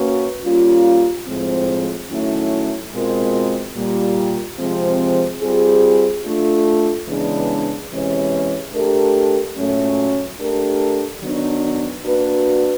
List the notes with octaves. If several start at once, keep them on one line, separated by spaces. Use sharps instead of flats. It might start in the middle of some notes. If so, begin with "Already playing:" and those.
Already playing: A#3 C#4 F#4 B4
G3 A#3 C#4 F4
A2 F3 G#3 C4
D#3 F#3 A3 C#4 E4
B2 G#3 C4 F4 A#4
A#2 G3 A#3
C3 F3 G#3 C4
G3 C4 F4 G#4
A3 D4 F4
C#3 E3 G#3 B3 D4
C3 E3 G#3 C#4
A3 D4 G4 A#4
A#2 F#3 A3 C#4
A3 D4 G4 A#4
D#3 F#3 B3 D4
A#3 D4 F#4 B4